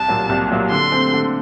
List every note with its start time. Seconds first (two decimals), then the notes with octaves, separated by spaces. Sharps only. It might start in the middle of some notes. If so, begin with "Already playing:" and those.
Already playing: C2 A5
0.08 A#2 F#3 A#3
0.29 C2
0.51 A#2 F#3 A#3
0.70 D3 C6
0.92 A3 C4
1.13 D3